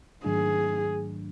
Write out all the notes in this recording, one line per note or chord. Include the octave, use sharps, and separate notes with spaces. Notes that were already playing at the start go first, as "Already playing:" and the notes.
G#2 D#3 F#3 A3 D4 G#4